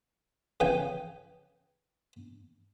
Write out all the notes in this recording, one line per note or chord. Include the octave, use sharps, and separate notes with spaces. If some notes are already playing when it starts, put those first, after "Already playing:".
C#3 E3 G5 G#5